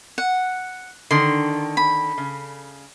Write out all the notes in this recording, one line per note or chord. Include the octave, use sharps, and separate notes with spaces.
F#5
D3 D#3 C6
B5
C#3